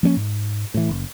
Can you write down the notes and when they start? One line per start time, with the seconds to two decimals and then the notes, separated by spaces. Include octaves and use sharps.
0.03 F3 A#3 C4 C#4
0.17 G#2
0.74 A2 E3
0.89 F#1